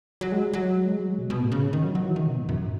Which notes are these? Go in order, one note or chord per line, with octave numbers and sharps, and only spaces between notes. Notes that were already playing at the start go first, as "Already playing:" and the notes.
F#3
G#3
F#3
G#3
F#3
G#3
B2
B2
A2
C#3
D#3
F#3
F#3
E3
D#3
B2
G#2
F#2